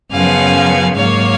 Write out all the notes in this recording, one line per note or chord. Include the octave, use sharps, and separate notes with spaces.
F#2 C#3 F3 B3 F5 G#5
G#2 F#3 A#3 C#5 F5